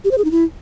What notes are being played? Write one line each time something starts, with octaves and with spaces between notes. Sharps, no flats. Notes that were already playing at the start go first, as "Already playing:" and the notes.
G4
C5
G#4
D#4
E4